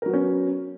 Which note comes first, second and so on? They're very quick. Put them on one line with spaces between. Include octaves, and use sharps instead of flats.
A#4 F#3 B3 C#4